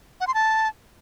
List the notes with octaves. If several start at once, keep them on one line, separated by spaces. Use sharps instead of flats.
F#5
C6
A5